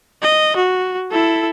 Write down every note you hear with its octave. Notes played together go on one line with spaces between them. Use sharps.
D#5
F#4
E4 A4